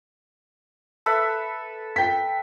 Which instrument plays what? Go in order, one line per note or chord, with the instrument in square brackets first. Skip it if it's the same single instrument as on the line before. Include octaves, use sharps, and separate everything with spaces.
[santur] A4 B4 E5
[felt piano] G5 B6